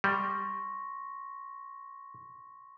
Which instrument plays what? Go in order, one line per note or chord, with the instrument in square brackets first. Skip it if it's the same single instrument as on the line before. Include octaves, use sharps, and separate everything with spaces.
[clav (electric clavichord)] G3 [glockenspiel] C6 C#6 A#6